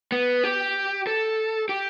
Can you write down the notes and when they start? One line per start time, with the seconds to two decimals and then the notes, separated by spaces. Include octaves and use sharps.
0.12 B3
0.44 G4
1.07 A4
1.69 G4